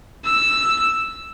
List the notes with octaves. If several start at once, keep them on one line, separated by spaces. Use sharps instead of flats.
E6